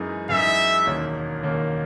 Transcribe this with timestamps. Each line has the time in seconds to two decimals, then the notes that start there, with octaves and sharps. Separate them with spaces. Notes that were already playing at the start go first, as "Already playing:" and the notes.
Already playing: F#2 E3 G#3 D#4 G#4
0.29 F#2 E3 G#3 D#4 G#4 E5
0.86 E1 D#2 D#3 A#3 C#4
1.43 E1 D#2 D#3 A#3 C#4